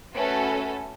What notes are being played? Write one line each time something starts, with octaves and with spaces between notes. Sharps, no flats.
A3 C#4 F#4 A4 B4